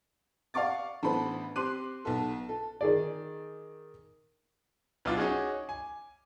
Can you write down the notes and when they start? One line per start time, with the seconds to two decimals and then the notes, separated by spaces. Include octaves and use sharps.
0.54 D5 F5 F#5 C#6 D6 A6
1.03 A1 B3 D4 A4 C5 B5
1.56 C4 G4 C6 D6 F#6 D#7
2.05 B1 B3 A4
2.49 A4
2.81 D#3 G#4 D5
5.05 B1 B3 D4 E4 F4 D6
5.17 C#4 D#4 F#4 G#4
5.69 G#5